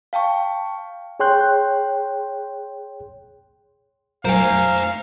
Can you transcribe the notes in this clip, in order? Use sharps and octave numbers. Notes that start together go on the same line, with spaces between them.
F5 G5 A5 C#6
G#4 C#5 G5 C6 F#6 G6
F#2 A#3 C4 C5 F5 G#5 A#5